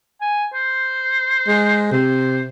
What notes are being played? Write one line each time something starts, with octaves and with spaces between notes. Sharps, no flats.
G#5
C5
G#3
C3 C5